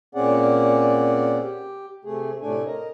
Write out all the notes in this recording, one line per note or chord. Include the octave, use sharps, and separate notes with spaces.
A#2 C4 C#4 G#4 D5 F#5
G4
C3 A3 G#4
A2 C3 A3 D4 G#5
A#4 D#5